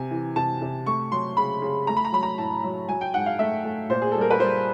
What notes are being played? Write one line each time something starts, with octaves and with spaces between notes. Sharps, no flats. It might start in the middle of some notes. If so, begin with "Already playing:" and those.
Already playing: C3 G#5
E3
C3 A5
C3
A3 C#6
F#3 C6
C#3 B5
C#3
A3 A#5
B5
A#5
F#3 B5
A#5
A2 A5
F#3
F#3 G#5
G5
G#2 F#5
F5
A3 E5
A3
A#2 C5
G#4
G3 A4
A#4
B4
G3 C5